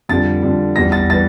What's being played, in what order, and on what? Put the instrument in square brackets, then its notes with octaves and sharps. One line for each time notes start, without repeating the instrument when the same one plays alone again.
[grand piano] F2 D3 G3 A6
F2 D3 G3
E2 E3 G3 A#6
A6
E3 G3 A6